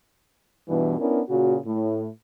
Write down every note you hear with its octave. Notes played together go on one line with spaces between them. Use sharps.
G2 B2 E3
B3 C#4 D4 E4 A#4
A#2 C#3 F#4
A2